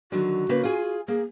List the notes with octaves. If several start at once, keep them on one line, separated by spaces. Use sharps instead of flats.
D3 D#3 F#3 F#4
C#3 A#3 B4
F4 G#4 G#5
A#3 G#4